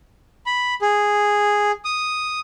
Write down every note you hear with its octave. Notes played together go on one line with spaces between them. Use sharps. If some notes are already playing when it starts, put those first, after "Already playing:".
B5
G#4
D#6